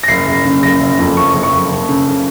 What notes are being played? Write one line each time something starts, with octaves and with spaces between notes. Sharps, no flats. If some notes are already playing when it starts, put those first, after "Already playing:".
A#6
F#1 C7
F#1
C#3
F#1 A#6
F#1
F2
F#1 C#6
F#1
C#6
F#1
F#1
C#3